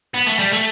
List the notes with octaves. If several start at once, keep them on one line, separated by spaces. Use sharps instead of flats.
B3
A3
G3
A3